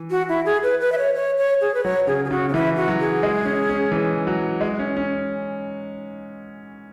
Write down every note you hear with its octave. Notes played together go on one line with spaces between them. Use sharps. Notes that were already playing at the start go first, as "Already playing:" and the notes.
Already playing: E3
F#4
E4
G#4
B4
B4
E5
C#5
C#5
C#5
G#4
B4
F#3 C#5
C#3 G#4
G#4
C#3 F#4
C#4
E3 E4
F#4
F#3
G#4
G#3
C#4
C#4
E3
F#3
G#3
C#4
C#4